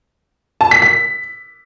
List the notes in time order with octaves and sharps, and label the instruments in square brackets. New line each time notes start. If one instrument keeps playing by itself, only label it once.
[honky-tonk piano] A5
B6
B6